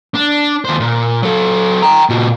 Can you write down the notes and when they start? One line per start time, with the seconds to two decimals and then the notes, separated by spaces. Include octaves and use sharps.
0.15 D4
0.65 D#2 C5
0.80 A#2
1.22 F#3 A4
1.82 G5 A#5
2.09 A#2 F#4